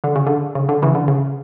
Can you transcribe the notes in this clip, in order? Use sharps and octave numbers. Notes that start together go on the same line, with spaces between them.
D3
C#3
D3
C#3
D3
C#3 E3
D3
C#3